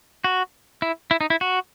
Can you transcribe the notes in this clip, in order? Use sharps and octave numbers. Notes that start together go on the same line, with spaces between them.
F#4
E4
E4
D#4
E4
F#4